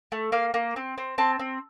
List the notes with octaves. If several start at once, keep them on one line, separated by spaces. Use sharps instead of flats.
A3
A#3 F5
A#3
C4
C4
C4 A5
C4